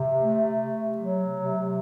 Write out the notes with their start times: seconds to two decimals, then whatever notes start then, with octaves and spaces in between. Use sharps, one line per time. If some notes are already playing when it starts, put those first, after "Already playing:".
Already playing: C3
0.20 A3
0.59 C3
0.98 F#3
1.36 C3